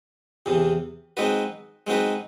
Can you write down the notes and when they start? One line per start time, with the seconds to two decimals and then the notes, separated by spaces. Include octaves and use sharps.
0.46 E2 C3 E3
1.17 G#3 C4 D#4 F#4 B4
1.87 G#3 C4 D#4 F#4 B4